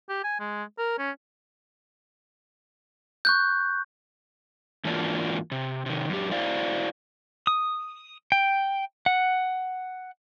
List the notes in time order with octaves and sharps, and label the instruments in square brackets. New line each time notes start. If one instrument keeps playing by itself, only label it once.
[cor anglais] G4
G#5
G#3
A#4
C#4
[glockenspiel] C#6 F#6 G6
[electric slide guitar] G#2 E3 A#3 D4 F4 F#4
C3
C3 D#3
F#2 G4
E4 F#4 C5 D5 F5
[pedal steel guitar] D#6
G5
F#5